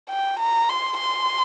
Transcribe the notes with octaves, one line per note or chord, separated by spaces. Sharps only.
G5
A#5
C6
C6